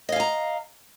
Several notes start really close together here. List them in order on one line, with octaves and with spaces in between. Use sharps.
D#5 F5 G#5 A#5